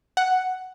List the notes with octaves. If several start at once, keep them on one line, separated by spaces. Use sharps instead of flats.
F#5